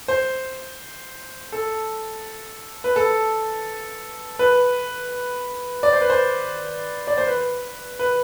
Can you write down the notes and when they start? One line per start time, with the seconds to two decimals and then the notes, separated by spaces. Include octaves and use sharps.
0.08 C5
1.52 A4
2.84 B4
2.96 A4
4.39 B4
5.83 D5
5.93 C5
6.01 B4
6.10 C5
7.07 D5
7.18 C5
7.27 B4
7.99 B4